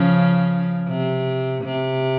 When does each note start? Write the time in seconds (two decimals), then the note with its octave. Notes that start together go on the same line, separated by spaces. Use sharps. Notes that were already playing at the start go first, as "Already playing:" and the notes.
Already playing: C#3 F3
0.88 C3
1.64 C3